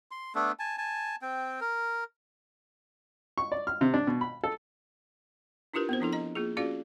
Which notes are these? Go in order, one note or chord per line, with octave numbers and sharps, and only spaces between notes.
C6
A3 B3 D4 A4
G#5 A5
G#5 A5
C4 G5
A#4
C#6
D5
F6
C3
D4
B2
B5
A4
D4 E4 F4 G4 A#4 B4
B3 C4 C5
F3 D4 E4 A4
D#5 A#5
A#3 F4 G#4
C#4 F4 F#4 G#4 D5 F5